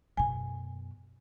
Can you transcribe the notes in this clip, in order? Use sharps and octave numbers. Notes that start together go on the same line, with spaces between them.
F#2 B2 G#5